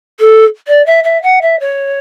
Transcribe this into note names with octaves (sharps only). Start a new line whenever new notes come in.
A4
D5
E5
E5
F#5
E5
C#5